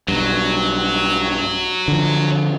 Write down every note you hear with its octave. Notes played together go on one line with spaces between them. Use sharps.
B1 G2 F#3
D3 F3